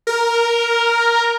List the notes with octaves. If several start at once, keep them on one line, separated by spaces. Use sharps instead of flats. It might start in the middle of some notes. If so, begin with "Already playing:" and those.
A#4